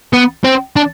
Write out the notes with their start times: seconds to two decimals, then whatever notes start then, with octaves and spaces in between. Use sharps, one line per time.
0.13 B3
0.44 C4
0.76 D4